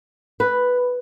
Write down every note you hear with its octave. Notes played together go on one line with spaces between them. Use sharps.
B4